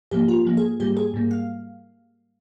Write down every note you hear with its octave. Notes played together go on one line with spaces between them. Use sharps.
G#2 F3 A#3 G4
F4
G#2 F3 A#3
G#4
G#2 G3 A#3 G4
G#4
G#2 G3 A#3
F5